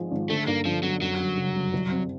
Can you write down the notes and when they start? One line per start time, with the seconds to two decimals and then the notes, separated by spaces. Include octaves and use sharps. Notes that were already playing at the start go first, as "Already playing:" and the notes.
Already playing: G#1 F3 G#3
0.11 G#1
0.29 D3 A3
0.47 G2 A#3
0.65 G1 F3
0.83 G1 F#3
1.01 F#2 F#3
1.19 G1
1.37 C#3
1.55 G1
1.73 C2
1.91 C4